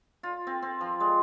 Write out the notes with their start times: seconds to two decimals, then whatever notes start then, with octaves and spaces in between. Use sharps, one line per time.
0.23 F4
0.47 C4
0.62 C4
0.81 F3
1.00 G#3